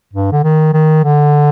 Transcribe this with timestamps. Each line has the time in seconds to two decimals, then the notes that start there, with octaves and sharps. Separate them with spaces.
0.13 G2
0.32 D3
0.44 D#3
0.74 D#3
1.04 D3